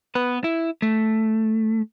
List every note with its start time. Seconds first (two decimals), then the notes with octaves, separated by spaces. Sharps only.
0.15 B3 B4
0.44 E4
0.82 A3